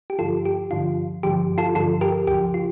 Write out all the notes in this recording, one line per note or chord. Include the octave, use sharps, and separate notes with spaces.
G4
G2 D3 F3 F4 A4
G4
G2 D3 F3 F4
G2 D3 F3 G4
F4 A4
G2 D3 F3 F4 A4
G4 A#4
D2 C#3 F3 G4
F4